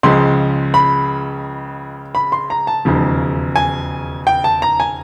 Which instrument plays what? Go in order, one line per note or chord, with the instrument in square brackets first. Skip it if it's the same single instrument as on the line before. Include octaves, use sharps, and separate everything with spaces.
[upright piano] C#2 C#3 F3 G#3 C6
B5
B5
C6
A#5
A5
E1 D#2 C#3 F3
G#5
G5
A5
A#5
G#5